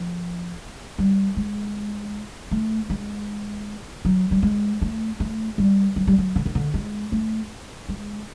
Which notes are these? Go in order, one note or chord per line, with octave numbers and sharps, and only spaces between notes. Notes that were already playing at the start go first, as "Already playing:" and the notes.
Already playing: F3
G3
G#3
A3
G#3
F#3
G3
G#3
A3
A3
G3
F#3
G3
F#3
D3
D#3
D3
G#3
A3
G#3